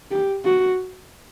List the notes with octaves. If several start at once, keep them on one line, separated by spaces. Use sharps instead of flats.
G4
F#4